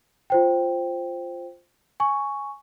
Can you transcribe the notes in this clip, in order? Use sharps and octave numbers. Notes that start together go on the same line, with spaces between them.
F4 C5 G5
G#5 C#6